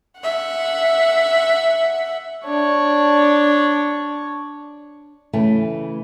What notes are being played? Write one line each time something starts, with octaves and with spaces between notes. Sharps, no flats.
E5 F#5
D4 C#5
C#3 E3 A3